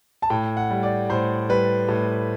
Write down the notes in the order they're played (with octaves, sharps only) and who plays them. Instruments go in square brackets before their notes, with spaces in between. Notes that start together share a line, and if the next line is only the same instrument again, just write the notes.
[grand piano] A5
A2 G5
F#5
G3
D5
A2 C5
G3 B4
A2